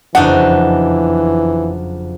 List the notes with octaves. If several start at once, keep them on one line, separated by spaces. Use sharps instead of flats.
F#1 F2 E3 D4 D#4 F#4 F5 F#5